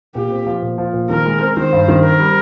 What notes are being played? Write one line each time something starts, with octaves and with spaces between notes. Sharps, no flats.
A#2 G4
C4
F3
A#2
F3
A#2
D#3 A#4
G#3
C4
D#3 C5
G2
D#3
C4 A#4
G3